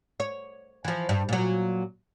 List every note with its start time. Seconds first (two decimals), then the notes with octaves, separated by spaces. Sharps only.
0.20 C#5
0.84 E3 F3
1.09 G2
1.29 A#2 F#3